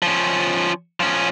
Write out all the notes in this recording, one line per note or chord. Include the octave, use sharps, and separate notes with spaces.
F3 C#4
F3 C#4